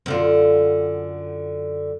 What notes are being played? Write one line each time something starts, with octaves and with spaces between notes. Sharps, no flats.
F#2 D3 F4